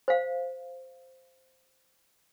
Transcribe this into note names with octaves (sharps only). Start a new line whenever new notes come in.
C5 F5